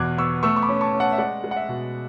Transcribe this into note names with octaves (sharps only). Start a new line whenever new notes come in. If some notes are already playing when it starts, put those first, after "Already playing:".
Already playing: E2 B2 D6 F#6 G#6
B3 C#6 E6
A3 C#6 E6
C#6
B5 D6
C#4
A5 C#6
C#4
F#5 A5
E5
G#3 D5 F#5
G#3
F#5
E5
B2